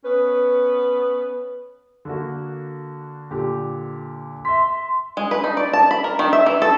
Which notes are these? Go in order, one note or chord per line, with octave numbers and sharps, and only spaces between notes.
B3 C#4 B4
D3 A#3 F#4
A#2 D3 G4
E5 C6 B6
G#3
B4
D#4
D5
A5
B5
A#4
D#3
E5
E3
A4